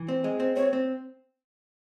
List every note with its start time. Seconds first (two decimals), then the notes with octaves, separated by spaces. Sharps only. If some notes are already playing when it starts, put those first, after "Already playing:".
Already playing: E3
0.08 C4
0.24 G#3
0.40 C4
0.56 C4 C#5
0.73 C4